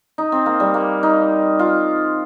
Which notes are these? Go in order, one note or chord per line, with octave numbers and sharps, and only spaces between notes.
D#4
C4
A#3
G3
A#3
D#4
F4